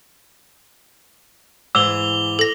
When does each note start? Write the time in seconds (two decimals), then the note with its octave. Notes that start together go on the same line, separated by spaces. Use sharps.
1.75 G#2 E3 D6 E6 F7 G7
2.39 A4 A#6